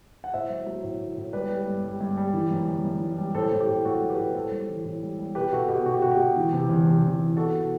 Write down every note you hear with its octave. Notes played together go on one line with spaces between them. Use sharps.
F#5
A2 C5 E5
F#3
F#3
A2
A2
A2
G3 B4 D5
G3
G2
G3
G2
G3
E3
F#2
F#2
F#2
E3
G3
A2 A4 C5
A2 A4
G4
A2
A2 F#4 A4
F#3
G4 B4
A2
A2 A4 C5
G3
E3
A2
G3
G3
B2 G4 B4
B2 F#4 A4
B2 G4
B2 F#4
G4
B2 F#4
G4
B2
E3
C3
E2
C3
E2
E3
B2 F#4 A4
B2